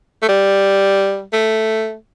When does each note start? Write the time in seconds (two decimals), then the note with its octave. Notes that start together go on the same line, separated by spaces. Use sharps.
0.22 A3
0.29 G3
1.33 A3